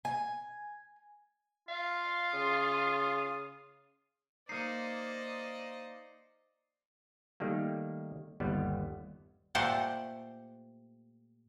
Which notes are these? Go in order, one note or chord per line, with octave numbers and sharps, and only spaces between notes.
G#5
F4 F5
C#3 D#6
A#3 D#4 C5 D5 D#5 C7 C#7
D#3 G3 A3 A#3
G1 D#2 G3 B3
A#2 A3 G4 A4 C5 F#5